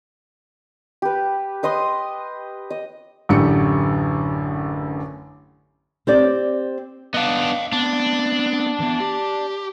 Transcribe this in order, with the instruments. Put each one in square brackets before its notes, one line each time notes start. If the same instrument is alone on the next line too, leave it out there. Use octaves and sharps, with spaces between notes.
[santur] G4 B4
B4 D#5 C6 D#6
D#5
[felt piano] A1 F#2 D3 G4 C#7
[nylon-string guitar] C4 G4 D5
[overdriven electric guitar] B3 D4 [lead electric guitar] D#5 F5
[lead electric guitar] B3 C4 [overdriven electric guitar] D4
[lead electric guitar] E3 B3
G4